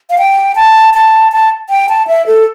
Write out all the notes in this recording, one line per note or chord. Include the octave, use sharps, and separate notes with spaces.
F5
G5
A5
A5
A5
G5
A5
E5
A4